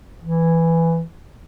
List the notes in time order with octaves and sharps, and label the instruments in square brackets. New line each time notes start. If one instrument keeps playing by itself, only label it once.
[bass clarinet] E3